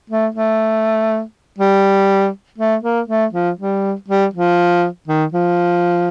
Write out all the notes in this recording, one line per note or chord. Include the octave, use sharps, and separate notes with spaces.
A3
A3
G3
A3
A#3
A3
F3
G3
G3
F3
D#3
F3